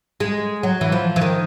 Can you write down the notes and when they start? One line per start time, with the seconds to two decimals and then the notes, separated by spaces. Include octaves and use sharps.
0.20 G#3
0.63 F#3
0.81 E3
0.92 F3
1.16 E3
1.21 D#3